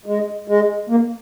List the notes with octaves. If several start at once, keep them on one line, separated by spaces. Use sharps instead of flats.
G#3
G#3
A#3